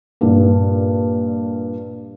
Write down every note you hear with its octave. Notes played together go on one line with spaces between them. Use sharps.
G2 A#2